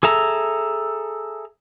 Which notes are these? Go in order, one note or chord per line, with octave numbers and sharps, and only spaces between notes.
G#4 A4 E5 A#5